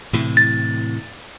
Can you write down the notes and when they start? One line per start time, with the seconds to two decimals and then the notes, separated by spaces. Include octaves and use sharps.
0.13 A2 C3 E3
0.37 A6